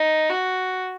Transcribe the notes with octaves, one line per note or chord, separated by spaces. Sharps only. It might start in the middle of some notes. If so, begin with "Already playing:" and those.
Already playing: D#4
F#4